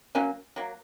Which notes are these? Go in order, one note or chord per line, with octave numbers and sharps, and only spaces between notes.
F#3 A#3 C#4
F#3 A#3